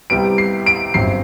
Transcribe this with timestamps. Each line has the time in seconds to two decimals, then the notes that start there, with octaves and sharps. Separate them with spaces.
0.10 C2 C3 G3 B3 D7
0.38 C7
0.66 D7
0.94 G1 F#2 F#3 C4 C7